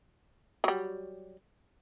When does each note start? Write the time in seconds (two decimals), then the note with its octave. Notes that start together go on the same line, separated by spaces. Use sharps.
0.64 F#3 G3